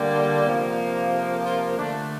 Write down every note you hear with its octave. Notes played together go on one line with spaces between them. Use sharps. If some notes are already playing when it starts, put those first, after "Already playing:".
Already playing: D3 G3 A#3
C3 F3 A#3
A4
F4
D3 A3 D4